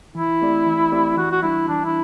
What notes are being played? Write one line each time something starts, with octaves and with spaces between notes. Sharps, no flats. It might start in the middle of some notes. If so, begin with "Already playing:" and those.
E3 E4
A3 C4 G4 D5
E3
A3 C4 G4 D5
E3 F#4
F#4
G3 D4 E4
E3 D4
E4